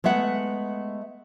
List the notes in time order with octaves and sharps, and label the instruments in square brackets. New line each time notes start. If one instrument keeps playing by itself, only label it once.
[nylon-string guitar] G#3 A3 B3 E5 F#5